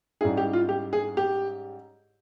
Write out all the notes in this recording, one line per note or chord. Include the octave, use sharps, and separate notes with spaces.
G#2 G3 C#4 E4 G#4
G4
F4
G4
G#4
G4